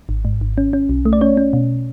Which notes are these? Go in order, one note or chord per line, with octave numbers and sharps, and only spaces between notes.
G#1
G#2
G#1
C#4
C#4
B1
A3
D5
C#4 C#5
C#4
B2